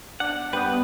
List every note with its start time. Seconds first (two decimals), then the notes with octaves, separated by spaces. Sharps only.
0.20 D4 F#5
0.53 G2 B3 D4 B4 G5